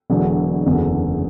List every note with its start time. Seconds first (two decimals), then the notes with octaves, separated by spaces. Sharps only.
0.10 E1 E2 D3 F#3
0.66 F#1 E2 D3 F#3